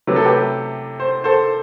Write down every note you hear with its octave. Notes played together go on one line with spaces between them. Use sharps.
C3 F#3 A3 B4
A4
G4 B4
C5
A4 C5